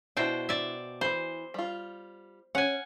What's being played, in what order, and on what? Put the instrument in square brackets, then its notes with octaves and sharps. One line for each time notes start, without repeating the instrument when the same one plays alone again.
[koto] B2 C5 G5 [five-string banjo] D4 E4
[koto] D5 E5
[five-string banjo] E3 B5 [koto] C5
[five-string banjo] G3 F4
[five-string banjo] C#4 [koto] F#5 G#5